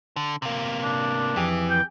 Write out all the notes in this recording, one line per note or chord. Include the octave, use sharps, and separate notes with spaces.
D3
C3 A#3
D4
F2 E3 G4 G#4
G5